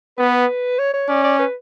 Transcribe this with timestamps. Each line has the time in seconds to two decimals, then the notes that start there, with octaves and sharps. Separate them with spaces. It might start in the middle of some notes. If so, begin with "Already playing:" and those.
0.18 B3 B4
0.78 C#5
0.94 C#5
1.09 C#4 D5
1.24 D5
1.39 B4